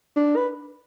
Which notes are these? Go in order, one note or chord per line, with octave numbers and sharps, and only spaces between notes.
D4
B4